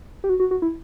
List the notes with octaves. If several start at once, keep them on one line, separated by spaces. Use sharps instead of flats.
G4
F#4
F#4
F#4
E4